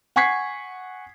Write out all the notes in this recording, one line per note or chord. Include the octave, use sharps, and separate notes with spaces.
F#5 G#5 C#6 G#6 B6 C7